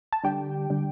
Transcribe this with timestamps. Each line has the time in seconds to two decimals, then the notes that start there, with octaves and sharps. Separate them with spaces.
0.13 A5
0.24 D3 G3 D4 G4 G5
0.70 D3 G3 D4